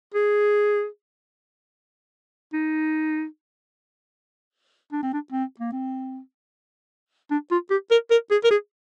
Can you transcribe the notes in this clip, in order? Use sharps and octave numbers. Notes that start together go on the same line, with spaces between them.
G#4
D#4
D4
C4
D4
C4
A#3
C4
D4
F4
G4
A#4
A#4
G#4
A#4
G#4